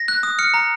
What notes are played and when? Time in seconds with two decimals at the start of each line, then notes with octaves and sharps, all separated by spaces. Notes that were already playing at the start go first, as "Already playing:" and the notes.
Already playing: A#6
0.08 F#6
0.23 D#6
0.39 F6 C#7
0.54 A#5